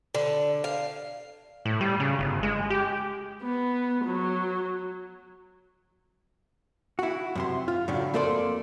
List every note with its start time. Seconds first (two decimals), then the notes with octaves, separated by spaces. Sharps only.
0.15 D3
0.64 F5
1.65 A2
1.81 G3
2.00 C#3
2.19 G1
2.43 G#3
2.70 G4
3.42 B3
4.05 F#3
6.99 E4 F#4
7.35 F#2 C3 C6
7.68 F4
7.88 F#2 A2 C#3 C#4 D4
8.14 F2 A3 A#3 A4 D5 C6